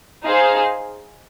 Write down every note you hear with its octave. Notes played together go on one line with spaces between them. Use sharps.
D#4 G#4 C5 F5